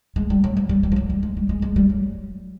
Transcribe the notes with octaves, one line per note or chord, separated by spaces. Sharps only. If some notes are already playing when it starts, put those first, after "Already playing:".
G#3
G3
F#3
F3
G3
G3
F3
F#3
G3
G#3
G3
G#3
G#3
G3
F#3